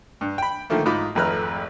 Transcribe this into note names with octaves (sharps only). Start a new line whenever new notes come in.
G2
G5 B5
D3 D#3 F3 A3 A#3
G#2 D#4 F4 B5 D6
G#1 F2 A3 B4 A#5 F6